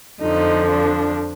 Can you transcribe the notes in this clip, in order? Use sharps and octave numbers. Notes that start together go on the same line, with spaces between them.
F2 D3 F3 D#4
D4